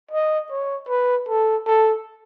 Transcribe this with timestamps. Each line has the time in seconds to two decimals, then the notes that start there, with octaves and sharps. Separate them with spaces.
0.12 D#5
0.51 C#5
0.89 B4
1.29 A4
1.67 A4